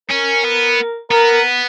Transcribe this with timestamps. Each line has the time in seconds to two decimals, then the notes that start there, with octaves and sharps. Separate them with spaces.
0.10 C#4 A#4
0.44 B3
1.11 B3 A#4